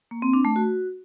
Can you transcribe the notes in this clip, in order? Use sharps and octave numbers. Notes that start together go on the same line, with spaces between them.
A#3
C4
D4
A3
F#4